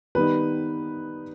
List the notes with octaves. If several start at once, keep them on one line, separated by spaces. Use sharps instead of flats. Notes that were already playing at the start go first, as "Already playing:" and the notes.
D#3 G3 B3 D#4 B4